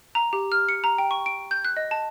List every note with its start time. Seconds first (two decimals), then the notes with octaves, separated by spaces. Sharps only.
0.15 A#5
0.33 G4
0.52 F6
0.68 C#7
0.84 A#5
0.98 G5
1.11 C#6
1.26 D7
1.51 G6
1.65 F#6
1.77 D#5
1.91 A5